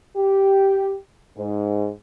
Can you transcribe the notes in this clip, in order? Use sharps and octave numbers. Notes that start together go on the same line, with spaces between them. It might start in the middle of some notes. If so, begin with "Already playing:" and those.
G4
G#2